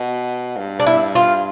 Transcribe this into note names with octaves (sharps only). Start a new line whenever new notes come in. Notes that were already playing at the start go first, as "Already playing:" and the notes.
Already playing: B2
G2
D4
E4
F4